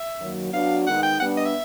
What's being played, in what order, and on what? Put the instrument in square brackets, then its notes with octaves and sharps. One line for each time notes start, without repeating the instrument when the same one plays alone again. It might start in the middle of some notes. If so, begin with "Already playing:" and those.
Already playing: [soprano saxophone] E5
[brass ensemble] F#2 D#3 F#3 A#3
[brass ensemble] F#3 B3 D4 F#4 [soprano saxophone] F5
[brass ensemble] D#3 G#3 B3 D#4 [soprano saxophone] F#5
[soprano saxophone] G5
[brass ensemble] G3 B3 D4 [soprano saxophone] F#5
[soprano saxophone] D#5
E5